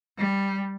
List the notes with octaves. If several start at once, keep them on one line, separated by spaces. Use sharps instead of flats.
G3